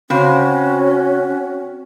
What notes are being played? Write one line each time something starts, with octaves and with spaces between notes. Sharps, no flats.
C#3 C4 C#4 F#4 C5